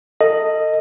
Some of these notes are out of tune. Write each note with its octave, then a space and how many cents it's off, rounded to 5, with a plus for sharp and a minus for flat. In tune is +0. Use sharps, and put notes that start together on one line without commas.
A4 +30 D#5 +0